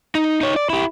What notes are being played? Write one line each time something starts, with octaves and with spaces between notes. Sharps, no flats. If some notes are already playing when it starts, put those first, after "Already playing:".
D#4
D#4 C#5
D5
E4 G4